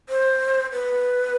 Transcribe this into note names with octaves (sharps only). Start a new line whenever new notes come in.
C5
B4